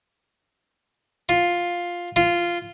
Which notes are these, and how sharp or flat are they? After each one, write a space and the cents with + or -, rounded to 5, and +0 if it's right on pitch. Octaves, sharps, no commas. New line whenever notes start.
F4 +5
F4 -10